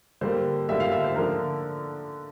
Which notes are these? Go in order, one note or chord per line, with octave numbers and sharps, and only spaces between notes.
D3 G3 A#3 C5
D3 G3 A#3 E5
F5
E5
C5
D3 F3 A#3 D4 A#4